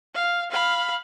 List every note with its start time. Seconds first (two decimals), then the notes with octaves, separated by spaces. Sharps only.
0.14 F5
0.51 F5 B5